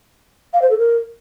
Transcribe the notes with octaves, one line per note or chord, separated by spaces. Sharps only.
F5
C5
A4
A#4